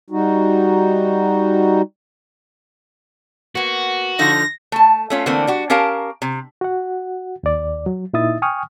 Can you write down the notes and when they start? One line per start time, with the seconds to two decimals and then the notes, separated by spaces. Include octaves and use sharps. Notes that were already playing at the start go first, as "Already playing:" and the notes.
0.10 G3 D#4 F#4
3.55 A#3 B3 F#4
4.19 D3 F3 D#4 A#6
4.72 A3 A5
5.10 A3 C#4 F4
5.26 D3 E3 A3 A#3 C4
5.47 G3 F#4
5.70 C#4 G4 A#4 F5 A5 A#5
6.22 C3
6.61 F#4 F#5
7.43 D#2 D5
7.86 F#3
8.13 A#2 D#4 E4 E5 D#6 A6
8.42 G5 G#5 C#6 D#6 F6